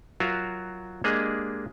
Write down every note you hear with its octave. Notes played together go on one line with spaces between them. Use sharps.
F#3 F4 F#4 A#4 E5 F5
G#3 A#3 D4 G4 G#4 D#5